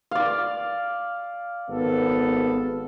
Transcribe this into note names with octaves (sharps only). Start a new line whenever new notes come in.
D5 F5
G#1 B3 A4